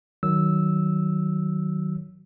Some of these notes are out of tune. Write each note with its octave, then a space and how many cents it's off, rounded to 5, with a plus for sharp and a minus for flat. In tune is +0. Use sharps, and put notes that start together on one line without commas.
D#3 +5 F#3 +10 E6 -10